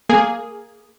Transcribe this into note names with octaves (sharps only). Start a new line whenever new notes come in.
A#3 G#4